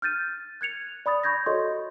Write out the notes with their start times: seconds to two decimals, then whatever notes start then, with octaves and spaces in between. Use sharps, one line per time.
0.02 F6 G6 A6 D#7
0.61 F#6 G#6 C#7 F7
1.06 D5 B5 D#6 A6
1.24 B5 C#6 G6 G#6 A#6
1.46 F#4 A4 C#5 D#5 C6 C#6